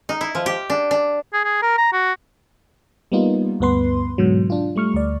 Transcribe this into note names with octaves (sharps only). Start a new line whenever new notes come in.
D#4
E4
F3
G4
D4
D4
G#4
G#4
A#4
A#5
F#4
G3 A#3 B3 D#4 F4
D2 G2 B3 B4 C6
G#2 B2 D3 F#3
D4 F4
G3 A3 C#6 F6
D2 D5